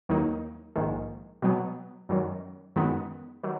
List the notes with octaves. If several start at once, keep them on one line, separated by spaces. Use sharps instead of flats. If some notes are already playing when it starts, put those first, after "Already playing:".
D#2 D#3 F#3 A#3 D#4
A#1 G#2 D#3 G#3
B2 F#3 B3
F#2 D#3 F#3
F#2 D#3 G#3 B3 D#4
D#3 F#3